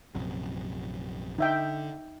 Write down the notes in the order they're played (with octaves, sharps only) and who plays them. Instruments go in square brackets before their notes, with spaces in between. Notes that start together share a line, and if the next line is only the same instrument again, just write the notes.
[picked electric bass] A#1 F#2 C3
[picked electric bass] D3 [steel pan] D#4 E5 G5